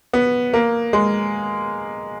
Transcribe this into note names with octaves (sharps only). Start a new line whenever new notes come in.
B3
A#3
G#3